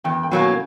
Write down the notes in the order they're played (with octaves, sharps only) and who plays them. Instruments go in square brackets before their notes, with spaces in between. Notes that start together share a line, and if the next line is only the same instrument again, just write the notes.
[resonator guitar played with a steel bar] E2 [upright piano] G5
[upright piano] G5
[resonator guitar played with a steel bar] B2 F#3 A#3
[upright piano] G#5